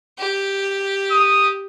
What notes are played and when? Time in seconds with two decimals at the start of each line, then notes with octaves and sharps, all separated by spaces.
0.19 G4
1.11 D#6